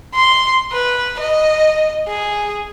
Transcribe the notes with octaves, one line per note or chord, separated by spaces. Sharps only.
C6
B4
D#5
G#4